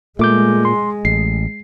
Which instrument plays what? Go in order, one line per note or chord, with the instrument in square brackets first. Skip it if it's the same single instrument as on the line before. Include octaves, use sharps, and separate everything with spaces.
[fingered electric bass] A#2 [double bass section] G#3 [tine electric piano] A3 D6 G6
[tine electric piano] C6
[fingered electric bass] A1 [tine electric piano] C7